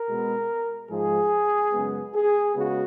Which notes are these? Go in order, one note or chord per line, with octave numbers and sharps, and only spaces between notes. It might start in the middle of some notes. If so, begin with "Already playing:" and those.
Already playing: A#4
B2 G#3 B3
G#2 F3 G#3 G#4
F#2 C#3 G#3 B3
G#4
C#3 G#3 B3 F#4